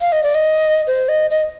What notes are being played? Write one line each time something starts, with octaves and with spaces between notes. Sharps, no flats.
F5
D#5
D5
D#5
C5
D#5
D#5